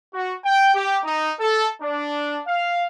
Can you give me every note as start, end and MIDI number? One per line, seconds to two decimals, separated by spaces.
0.14 0.33 66
0.44 0.70 79
0.75 0.98 67
1.04 1.31 63
1.40 1.68 69
1.82 2.38 62
2.47 2.86 77